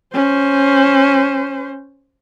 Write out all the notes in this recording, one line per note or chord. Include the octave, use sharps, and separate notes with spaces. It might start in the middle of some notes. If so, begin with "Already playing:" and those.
C#4 C5